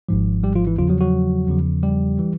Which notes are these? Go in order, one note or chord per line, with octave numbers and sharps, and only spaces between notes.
G#1 G#2 F3
G3 G4
F3 F4
E3 E4
E2 C#3 F3 F4
F#3 F#4
F#3 F#4
E2 C#3 F3
G3 G4
E3